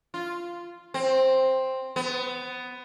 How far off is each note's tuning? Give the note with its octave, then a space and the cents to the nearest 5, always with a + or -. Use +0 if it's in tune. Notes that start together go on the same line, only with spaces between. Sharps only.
F4 -10
C4 +5
B3 +15